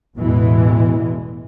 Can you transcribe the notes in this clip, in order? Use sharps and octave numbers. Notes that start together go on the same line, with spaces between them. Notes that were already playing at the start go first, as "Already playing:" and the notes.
A1 E2 B2 E3 G#3